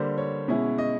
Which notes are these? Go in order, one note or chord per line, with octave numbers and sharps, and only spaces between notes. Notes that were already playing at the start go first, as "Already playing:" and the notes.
Already playing: D3 G3 A#3 D4 C5
C#5
B2 G#3 C#4 E4
D#5